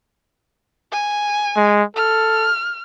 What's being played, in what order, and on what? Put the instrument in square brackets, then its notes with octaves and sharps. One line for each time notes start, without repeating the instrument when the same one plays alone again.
[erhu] G#5
[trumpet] G#3
[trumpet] A4 [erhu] F6